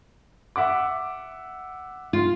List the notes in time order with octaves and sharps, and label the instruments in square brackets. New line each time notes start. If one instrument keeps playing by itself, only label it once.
[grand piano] E5 F#5 D6
[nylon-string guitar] F4